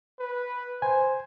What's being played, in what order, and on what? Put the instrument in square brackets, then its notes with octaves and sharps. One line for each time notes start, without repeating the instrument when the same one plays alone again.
[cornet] B4
[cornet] C5 [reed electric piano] G#5